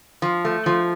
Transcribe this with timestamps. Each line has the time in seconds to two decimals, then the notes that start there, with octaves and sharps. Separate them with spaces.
0.22 F3
0.45 A3
0.66 F3